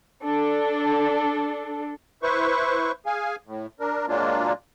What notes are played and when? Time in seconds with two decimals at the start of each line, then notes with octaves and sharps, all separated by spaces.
0.24 D4 A4
2.23 E4 B4 C5 C#6
3.06 G#4 F5 G#5
3.46 A2
3.80 D4 A#4
4.08 A#2 F#3 G#3 A#3 D4 F4